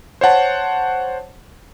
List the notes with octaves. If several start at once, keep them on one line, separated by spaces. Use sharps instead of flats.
C5 C#5 F#5 A5